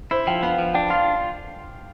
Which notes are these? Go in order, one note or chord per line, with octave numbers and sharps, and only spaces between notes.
E4 C5
F3 G5
B3 F5
F3 F5
D4 G5
F4 F5